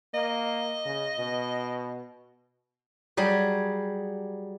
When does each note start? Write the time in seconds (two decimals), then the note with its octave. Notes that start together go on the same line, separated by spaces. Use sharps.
0.14 A#3 D#5
0.86 C#3
1.18 B2
3.17 F#3 G3 G#4